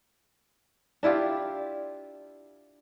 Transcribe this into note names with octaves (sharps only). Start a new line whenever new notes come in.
D4 E4 F4 G4